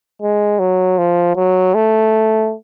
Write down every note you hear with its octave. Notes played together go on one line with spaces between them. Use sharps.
G#3
F#3
F3
F#3
A3